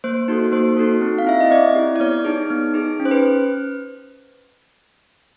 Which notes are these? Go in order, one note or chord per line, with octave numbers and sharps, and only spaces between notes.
A#3 C5
D#4 F#4 A4
A#3 C5
D#4 F#4 A4
C4
F5
E4 G4 E5
D#5
C4 D5
E4 G4
D5
B3 C#5
D#4 G#4
B3
D#4 G#4
C#4
C5
B4